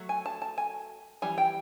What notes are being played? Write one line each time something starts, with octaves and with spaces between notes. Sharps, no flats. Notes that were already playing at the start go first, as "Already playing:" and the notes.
Already playing: F#3 A3
G#5
A5
A5
G#5
E3 G3 G#5
G5